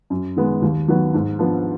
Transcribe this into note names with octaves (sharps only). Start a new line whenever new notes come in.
F#2
D#3 G#3 B3
D#2
D#3 F#3 B3
G#2
F3 B3 D4